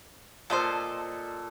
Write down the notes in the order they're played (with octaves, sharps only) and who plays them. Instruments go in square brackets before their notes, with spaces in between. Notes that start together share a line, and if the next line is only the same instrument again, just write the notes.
[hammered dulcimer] A#2 A4 [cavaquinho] C5 D#5 A5